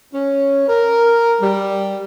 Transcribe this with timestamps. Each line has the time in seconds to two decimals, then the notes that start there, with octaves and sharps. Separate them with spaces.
0.14 C#4
0.69 A#4
1.41 G3